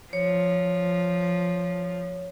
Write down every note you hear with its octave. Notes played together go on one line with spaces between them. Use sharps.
F3 C#5